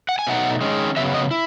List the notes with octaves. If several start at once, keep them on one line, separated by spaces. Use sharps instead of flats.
F#5
G#5
B2 F#3 A3 D#4 F#5
D#3 G#3 C#4
C#3 F#3 B3 E5
D#5
E4